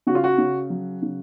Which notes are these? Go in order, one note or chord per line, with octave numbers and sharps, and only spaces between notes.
C#3 F#4
F4
F#4
C#3
F#3
C#3